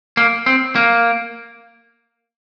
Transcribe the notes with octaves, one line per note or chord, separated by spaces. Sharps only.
A#3
C4
A#3